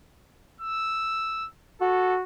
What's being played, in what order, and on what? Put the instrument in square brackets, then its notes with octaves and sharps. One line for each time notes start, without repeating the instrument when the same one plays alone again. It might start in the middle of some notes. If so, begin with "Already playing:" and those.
[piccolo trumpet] E6
[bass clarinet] F#4 [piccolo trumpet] A4